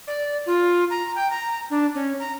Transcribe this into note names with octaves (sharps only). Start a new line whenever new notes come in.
D5
F4
A#5
G5
A#5
D4
C#4
A#5